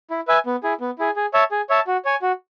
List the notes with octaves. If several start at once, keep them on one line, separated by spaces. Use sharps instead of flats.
E4
B4 E5 G#5
B3
E4 G#4
B3
E4 G#4
G#4
C#5 E5 A5
G#4
C#5 E5 A5
F#4
C#5 G#5
F#4